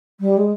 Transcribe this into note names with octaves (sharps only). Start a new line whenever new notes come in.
G3
G#3